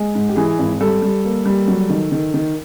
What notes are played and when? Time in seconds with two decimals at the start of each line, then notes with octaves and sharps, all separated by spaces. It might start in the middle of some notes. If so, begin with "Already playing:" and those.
Already playing: G#3
0.15 G#2
0.29 G4
0.36 E3 G#4
0.58 G#1
0.81 G3 A4
1.02 G3
1.24 A#3
1.45 G3
1.68 F#3
1.89 D#3
2.12 D#3
2.34 D#3